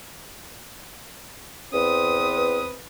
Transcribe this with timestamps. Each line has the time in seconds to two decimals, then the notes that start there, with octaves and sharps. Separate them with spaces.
1.74 E2 C4 B4 D#6